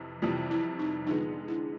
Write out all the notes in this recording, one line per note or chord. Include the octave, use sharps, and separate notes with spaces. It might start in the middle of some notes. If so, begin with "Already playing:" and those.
Already playing: F2 C3 E3
F2 C3 E3 G3 F4
E4
D#4
D3 F3 G#3 B3 D#4
E4